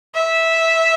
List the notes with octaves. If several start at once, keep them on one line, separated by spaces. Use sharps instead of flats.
E5